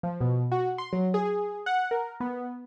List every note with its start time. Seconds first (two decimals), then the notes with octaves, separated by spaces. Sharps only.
0.03 F3
0.20 B2
0.52 F#4
0.78 C6
0.93 F#3
1.14 G#4
1.25 G#4
1.66 F#5
1.91 A#4
2.20 B3